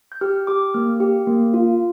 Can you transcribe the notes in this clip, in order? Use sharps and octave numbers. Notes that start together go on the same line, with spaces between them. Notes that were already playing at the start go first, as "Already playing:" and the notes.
G6
G4 F6
G4 D6
A#3 F6
G4
A#3
F4